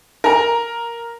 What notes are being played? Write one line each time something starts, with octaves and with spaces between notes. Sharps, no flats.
A#4 A#5